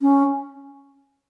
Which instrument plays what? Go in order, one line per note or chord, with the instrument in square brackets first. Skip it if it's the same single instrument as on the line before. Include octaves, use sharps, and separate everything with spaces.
[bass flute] C#4